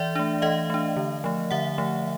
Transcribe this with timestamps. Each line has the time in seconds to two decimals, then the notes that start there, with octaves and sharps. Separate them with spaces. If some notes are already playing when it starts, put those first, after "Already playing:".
Already playing: E3 D5 E5
0.16 A3 D4
0.42 E3 D#5 F5
0.70 A3 D4
0.97 D3
1.24 F3 A3
1.51 D3 E5 F#5
1.78 F3 A3